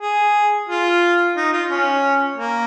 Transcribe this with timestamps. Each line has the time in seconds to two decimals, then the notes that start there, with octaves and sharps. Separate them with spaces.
0.02 G#4
0.69 F4
1.37 D#4
1.53 F4
1.70 C#4
2.38 A#3